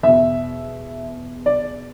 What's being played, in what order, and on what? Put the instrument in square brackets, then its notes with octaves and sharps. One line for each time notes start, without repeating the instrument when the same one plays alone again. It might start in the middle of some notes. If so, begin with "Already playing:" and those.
[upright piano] E2 B2 E5
D5